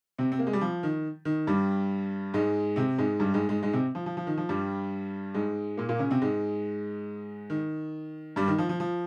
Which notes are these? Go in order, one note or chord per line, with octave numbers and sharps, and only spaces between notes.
C3 C4
C4
A#3
G#3
G3
F3
D#3
D#3
G2 G3
G#2 G#3
C3 C4
G#2 G#3
G2 G3
G#2 G#3
G#2 G#3
G#2 G#3
C3 C4
F3
F3
F3
D#3
F3
G2 G3
G#2 G#3
A#2 A#3
A#2 A#3
C#3 C#4
C3 C4
G#2 G#3
D#3
G2 G3
D#3
F3
F3
F3